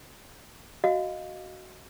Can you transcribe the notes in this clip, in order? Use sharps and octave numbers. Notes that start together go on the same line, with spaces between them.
F#4 D#5 F5